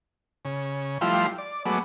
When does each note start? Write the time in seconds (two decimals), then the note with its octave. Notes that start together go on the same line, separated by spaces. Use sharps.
0.45 C#3
1.01 F3 G3 A3 E4 F4 C5
1.38 D5
1.66 F#3 G#3 A3 B3 D6